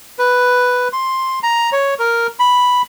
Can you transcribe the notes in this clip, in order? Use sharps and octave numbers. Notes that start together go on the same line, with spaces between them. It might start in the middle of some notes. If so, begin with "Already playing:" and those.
B4
C6
A#5
C#5
A#4
B5